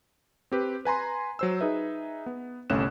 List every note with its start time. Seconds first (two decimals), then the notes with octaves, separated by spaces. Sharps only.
0.52 C4 G4 B4
0.85 B4 G#5 A#5 C6
1.39 F#3 C5 E6
1.61 D#4 G#4 B4 E5
2.26 B3
2.70 G1 C2 A3 C#4 F#6 E7